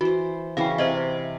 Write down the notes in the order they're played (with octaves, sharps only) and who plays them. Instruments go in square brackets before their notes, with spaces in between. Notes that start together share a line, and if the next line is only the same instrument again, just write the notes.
[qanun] E3 C5 [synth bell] F#4
[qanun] C#3 E3 C#4 [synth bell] F5 G5
[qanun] C3 [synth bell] C5 D#5 E5